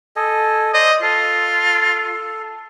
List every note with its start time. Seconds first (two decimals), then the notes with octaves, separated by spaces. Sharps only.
0.16 A4 D#5 G#5
0.74 C5 D5 D#5
1.02 F4 A4